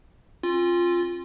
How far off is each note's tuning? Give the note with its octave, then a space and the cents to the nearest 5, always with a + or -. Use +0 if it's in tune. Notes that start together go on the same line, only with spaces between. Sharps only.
C#4 -45 F4 +0